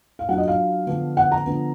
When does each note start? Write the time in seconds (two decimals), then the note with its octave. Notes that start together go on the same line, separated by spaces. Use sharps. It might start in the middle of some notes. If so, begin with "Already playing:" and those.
0.19 F5
0.29 F#3 D4 F4 F#5
0.38 D#5
0.48 F5
0.87 D3 F3 B3 D4
1.17 F#5
1.32 A#5
1.46 D3 F3 B3